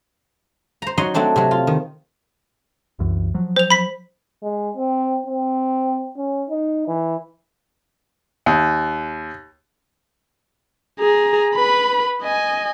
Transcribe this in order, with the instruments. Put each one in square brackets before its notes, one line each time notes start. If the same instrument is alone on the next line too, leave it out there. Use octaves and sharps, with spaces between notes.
[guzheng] C5 A#5
F#3 D#4 D#5 F#5 C6
F#3 A3 C4 D4 C5
C3 F#3
F4
D#3
[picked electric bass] C2 F#2 E3
F3 F#3
[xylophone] C5 F7
B5 B6
[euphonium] G#3
C4
C4
C#4
D#4
E3
[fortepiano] D#2
[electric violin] G#4 A#5
B4 B5
D#5 G#5